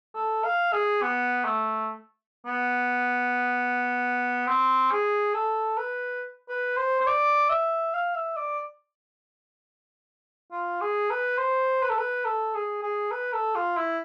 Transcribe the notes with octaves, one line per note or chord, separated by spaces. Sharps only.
A4
F5
G#4
B3
A3
B3
C4
G#4
A4
B4
B4
C5
C5
D5
E5
F5
E5
D5
F4
G#4
B4
C5
B4
A4
B4
A4
G#4
G#4
B4
A4
F4
E4